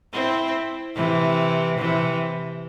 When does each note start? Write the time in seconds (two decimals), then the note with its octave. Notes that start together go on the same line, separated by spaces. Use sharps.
0.13 C4 E4
0.95 C3 E3
1.78 C3 E3